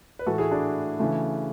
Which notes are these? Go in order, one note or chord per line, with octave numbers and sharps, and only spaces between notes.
B4
A2 E3 A3 F#4 A4
E4 G#4
D4 F#4
C#3 E3 A3